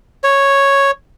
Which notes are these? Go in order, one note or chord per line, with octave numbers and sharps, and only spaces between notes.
C#5